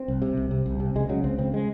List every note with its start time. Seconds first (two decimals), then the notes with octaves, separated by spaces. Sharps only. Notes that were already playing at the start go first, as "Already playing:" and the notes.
Already playing: C4
0.08 C2
0.22 C3
0.37 C2
0.51 C3
0.66 C2
0.80 C3
0.96 C#2 G#3
1.09 C#3 F#3
1.24 C#2 C4
1.39 C#3 C4
1.54 G#3